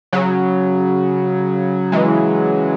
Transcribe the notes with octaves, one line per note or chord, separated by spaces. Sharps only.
C#3 F#3
E3 G#3